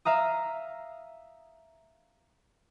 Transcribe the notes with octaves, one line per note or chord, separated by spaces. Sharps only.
E5 F5 A#5 D#6